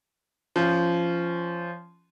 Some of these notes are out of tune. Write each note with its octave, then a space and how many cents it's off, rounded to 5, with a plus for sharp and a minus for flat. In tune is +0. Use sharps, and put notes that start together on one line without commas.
F3 -15 C#4 +0